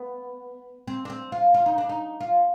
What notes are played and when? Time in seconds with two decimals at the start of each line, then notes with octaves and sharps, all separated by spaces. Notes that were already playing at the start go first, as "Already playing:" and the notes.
Already playing: B3
0.88 C4
1.05 D4
1.10 C4
1.32 F4
1.54 F4
1.66 D#4
1.78 D4
1.89 D#4
2.21 F4